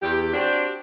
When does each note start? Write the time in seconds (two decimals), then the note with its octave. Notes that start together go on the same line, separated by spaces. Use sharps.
0.02 E2 G4
0.34 C4 D4 F#4 G4